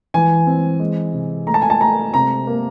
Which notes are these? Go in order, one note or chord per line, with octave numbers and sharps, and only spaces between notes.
E3 G#5
C4
G#3
C3
A3 A#5
A5
G#5
A5
A3 A#5
C3 A#5
A#3